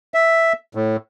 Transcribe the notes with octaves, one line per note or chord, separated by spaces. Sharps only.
E5
A2